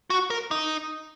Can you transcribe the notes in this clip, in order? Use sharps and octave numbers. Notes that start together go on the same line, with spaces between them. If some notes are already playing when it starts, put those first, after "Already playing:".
F#4
A#4
D#4